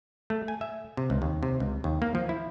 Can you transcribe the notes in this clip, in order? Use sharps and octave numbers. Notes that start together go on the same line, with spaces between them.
A3
G#5
E5
C3
C#2
D#2
C3
C#2
D#2
A#3
F3
E4